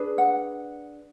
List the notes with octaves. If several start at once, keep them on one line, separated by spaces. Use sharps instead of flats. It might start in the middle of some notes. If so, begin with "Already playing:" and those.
Already playing: D4 G#4 B4
F#5